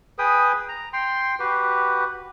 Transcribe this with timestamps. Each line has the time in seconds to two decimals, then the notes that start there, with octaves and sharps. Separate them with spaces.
0.19 G#4 B4 G5 D#6
0.69 A#5
0.93 G5 C6
1.40 F#4 G4 B4